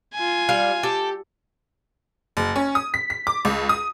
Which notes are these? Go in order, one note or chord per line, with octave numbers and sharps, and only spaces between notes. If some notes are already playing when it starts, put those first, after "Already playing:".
F4 G#5
G3 F5
G4 A4
F#1
C#4
D#6
B6
B6
D6
C#2
D#6